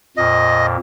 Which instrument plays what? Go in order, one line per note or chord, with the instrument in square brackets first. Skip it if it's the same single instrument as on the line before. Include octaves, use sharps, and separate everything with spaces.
[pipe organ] F2 A#2 [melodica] D#5